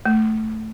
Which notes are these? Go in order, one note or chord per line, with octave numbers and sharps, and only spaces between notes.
A3